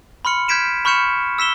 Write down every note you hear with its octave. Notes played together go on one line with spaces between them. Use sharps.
B5 C6 F6 C#7
F6 G6 G#6 B6 D7 E7
B5 C#6 F6 G6 C#7 E7
E6 B6 E7 G7